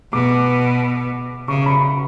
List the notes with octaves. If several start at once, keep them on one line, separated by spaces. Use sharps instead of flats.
B2 D6
C#3 C#6
B5